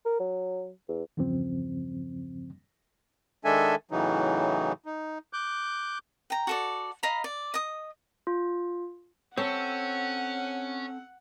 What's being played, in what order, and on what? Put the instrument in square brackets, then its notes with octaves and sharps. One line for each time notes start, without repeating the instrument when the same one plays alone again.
[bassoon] A#4
F#3
E2
[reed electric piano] E2 G2 C#3 F3 C4
[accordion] D#3 G#3 D4 A4 E5 G#5
A2 C#3 E3 F#3 D#4
D#4
D6 F#6 G6
[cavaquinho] G5 A#5
F#4 A4 D5
D#5 F5 A#5 B5
D5
D#5 D#6
[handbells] F4
[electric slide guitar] C4 A4 [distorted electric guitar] C#4 [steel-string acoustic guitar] C#5 [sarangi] F#5